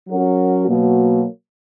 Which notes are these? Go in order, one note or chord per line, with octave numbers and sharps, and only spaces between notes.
F#3 C#4 F#4 A#4
B2 F#3 A#3